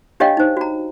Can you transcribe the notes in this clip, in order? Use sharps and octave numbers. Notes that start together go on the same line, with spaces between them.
D4 G4 C#5 D#5 F5 G5
D#4 C5
F#4 A#5